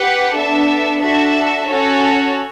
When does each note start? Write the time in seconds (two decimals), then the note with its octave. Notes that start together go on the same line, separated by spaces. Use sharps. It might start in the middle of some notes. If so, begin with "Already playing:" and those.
Already playing: G4 B4 F#5
0.35 B3 D4 A4 E5
1.00 D4 F#4 A4 E5
1.67 C#4 F#4 A4 C#5